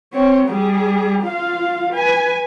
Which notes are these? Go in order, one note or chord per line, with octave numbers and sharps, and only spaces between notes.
C4 C#5
G3 G#4
F4 F5
B4 G#5